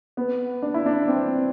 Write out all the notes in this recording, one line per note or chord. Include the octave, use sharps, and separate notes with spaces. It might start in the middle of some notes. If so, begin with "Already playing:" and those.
B3
D4
E4
D4
C4